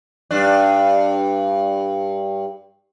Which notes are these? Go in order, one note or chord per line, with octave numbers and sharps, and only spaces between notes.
G2 D4